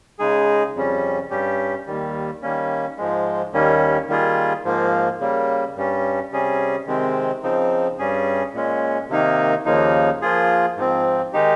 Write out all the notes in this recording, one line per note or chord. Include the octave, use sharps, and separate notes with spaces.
C#3 G#3 D#4 G#4
F2 C#3 G3 C#4
G2 G3 C#4 G4
D#2 D#3 G3
D#3 G3 A#3 C#4
G#2 F3 G#3
D#2 D#3 G3 A#3 C#4
D#3 G3 A#3 F4 G#4
G#2 F3 A#3
C#3 G3 A#3
G2 G3 C#4
C3 G3 C#4 G#4
C3 D#3 G#3 C4
C#3 F3 C4 D#4
G2 G3 C#4 G#4
A#2 G#3 C#4
C3 D#3 A#3 D#4
D#2 C#3 F3 A#3 D#4
F3 A#3 F4 G#4
G#2 F3 C4
D#3 G#3 D#4 G4